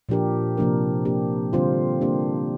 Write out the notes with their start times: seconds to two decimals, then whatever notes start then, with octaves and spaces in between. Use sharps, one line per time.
0.09 A#2 F3 D4 G4 A#4
0.57 C3 F3 A#3 D4 A#4
1.05 A#3 D4 G4
1.53 D3 G3 C4 F4 C5
2.01 A#3 D4 G4